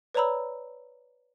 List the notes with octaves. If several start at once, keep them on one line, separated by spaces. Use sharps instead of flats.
B4 C#5 D5 A#5 B5 E6